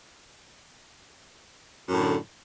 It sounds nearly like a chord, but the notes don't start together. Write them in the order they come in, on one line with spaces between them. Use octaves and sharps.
F#2 A2 D3